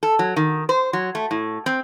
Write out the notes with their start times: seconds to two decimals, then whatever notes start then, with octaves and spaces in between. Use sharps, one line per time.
0.03 A4
0.19 F#3
0.36 D#3
0.69 C5
0.93 F#3
1.15 A3
1.31 A2
1.66 C4